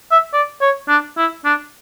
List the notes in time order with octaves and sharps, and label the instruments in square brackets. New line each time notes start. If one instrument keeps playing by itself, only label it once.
[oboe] E5
D5
C#5
D4
E4
D4